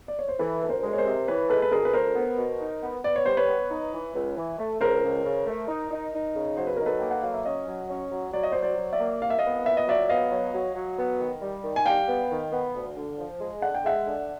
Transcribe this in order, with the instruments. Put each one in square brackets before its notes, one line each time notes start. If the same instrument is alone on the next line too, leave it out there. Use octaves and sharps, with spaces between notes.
[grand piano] D5
C#5
C5
[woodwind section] E3 [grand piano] A4 B4
[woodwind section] D2 [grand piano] B4
[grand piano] A#4 C5
[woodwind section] G#3
[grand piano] C#5
A#4 C5
[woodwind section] C3
[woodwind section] E3 [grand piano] B4 C#5
[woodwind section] G#3 [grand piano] A4 B4
[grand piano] B4
[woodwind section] D2 [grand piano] G#4 A#4
[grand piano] B4
[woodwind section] D2 [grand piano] A#4 C5
[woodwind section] B3
B2
D#4
B3
[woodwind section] B3 [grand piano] D5
[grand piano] C#5
[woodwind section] G3 [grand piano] C5
[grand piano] B4 C#5
[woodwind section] B3
D#4
E3
C#2
E3
A3
[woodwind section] C#2 [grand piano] A#4 C5
[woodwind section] C#2
C#3
A3
D#4
D#4
D#4
C#3
[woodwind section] F#3 [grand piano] C5
[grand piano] B4
[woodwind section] D#4 [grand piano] A#4
[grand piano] A4 B4
[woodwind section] A#3 [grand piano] G5
[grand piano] F#5
[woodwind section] F#3 [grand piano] F5
[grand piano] E5
[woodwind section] C#4 [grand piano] C#5 D#5
[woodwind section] F#3
C#4
F#3
[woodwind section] F#3 [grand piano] D5
[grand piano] D#5
C5 D5
[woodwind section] F#3
[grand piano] C5 D5
[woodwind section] F#3
[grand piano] D5 E5
[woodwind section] A#3
[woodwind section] C2 [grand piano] F5
[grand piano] E5
D#5 F5
[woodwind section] B3
[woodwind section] A#2 [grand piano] E5
[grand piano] D#5
[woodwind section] F#3 [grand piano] D5 E5
[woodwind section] B3 [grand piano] D#5 F5
[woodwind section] F#3
F#3
F#3
B3
D#3
G3
D#3
[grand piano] G#5
[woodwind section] G3 [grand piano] F5 G5
[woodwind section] B3
D#3
B3
D2
D3
F3
G#3
[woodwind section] D3 [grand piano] F#5
[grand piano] G5
[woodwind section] G#3 [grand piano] E5 F#5
[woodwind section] D3